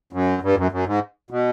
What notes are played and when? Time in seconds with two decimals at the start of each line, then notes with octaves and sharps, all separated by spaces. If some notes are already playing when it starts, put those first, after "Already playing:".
0.13 F#2
0.42 G2
0.52 F2
0.57 F#2
0.72 F#2
0.86 G#2
1.31 B2